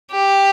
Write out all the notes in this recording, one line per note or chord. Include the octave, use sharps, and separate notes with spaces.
G4